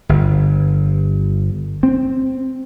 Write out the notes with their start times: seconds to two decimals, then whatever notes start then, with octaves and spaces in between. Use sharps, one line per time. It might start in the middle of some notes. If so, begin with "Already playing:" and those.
0.09 G1
1.83 C4